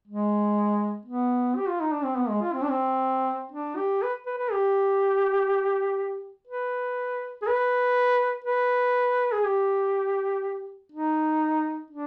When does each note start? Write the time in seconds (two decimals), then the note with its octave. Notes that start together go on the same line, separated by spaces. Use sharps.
0.08 G#3
1.06 B3
1.56 G4
1.68 F4
1.81 D#4
1.92 D4
2.04 C4
2.17 B3
2.29 G#3
2.41 F4
2.53 C4
2.62 D4
2.69 C4
3.52 D4
3.77 G4
4.02 B4
4.26 B4
4.38 B4
4.52 G4
6.48 B4
7.42 G#4
7.47 B4
8.45 B4
9.32 G#4
9.44 G4
10.92 D#4
11.91 D4